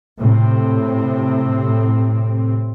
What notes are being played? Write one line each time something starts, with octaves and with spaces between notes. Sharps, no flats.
A2 C3 C4